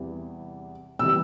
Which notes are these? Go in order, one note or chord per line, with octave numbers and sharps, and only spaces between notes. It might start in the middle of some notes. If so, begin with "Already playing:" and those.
Already playing: E2 C3 E3 G3
C3 E3 G3 E6